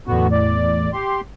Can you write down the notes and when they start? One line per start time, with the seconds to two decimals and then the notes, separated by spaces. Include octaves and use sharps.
0.07 E2 A2 D3 B3 F#4
0.32 D5
0.93 G4 C6